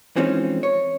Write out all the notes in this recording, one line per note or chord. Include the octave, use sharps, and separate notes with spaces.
E3 F3 G#3 C4 C#4 D#4
C#5